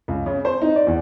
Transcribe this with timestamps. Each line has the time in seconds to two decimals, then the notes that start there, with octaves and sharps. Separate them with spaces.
0.08 C#2
0.26 C#3
0.45 C5
0.62 D#4
0.76 D5
0.87 E2